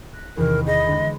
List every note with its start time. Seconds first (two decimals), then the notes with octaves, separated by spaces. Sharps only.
0.13 F#6 A#6 B6
0.37 E2 C3 D#3 A#4
0.66 G#4 D#5 B5
0.87 D3 G#3